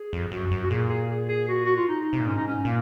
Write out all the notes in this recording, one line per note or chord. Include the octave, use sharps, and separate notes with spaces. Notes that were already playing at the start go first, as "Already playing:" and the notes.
Already playing: G#4
F2
F#2 F#4
F#2
F#4
A#2 G#4
G#4
G#4
G#4
F#4
F#4
F4
D#4
C3
A#2
G#2 C#4
D#4
C#4
A#2 A#3